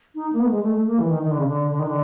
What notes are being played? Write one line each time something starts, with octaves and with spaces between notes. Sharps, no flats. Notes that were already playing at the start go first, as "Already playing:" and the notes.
D#4
A#3
B3
A3
G#3
A3
A3
A#3
E3
D#3
D#3
D3
C#3
D3
D3
D#3
D3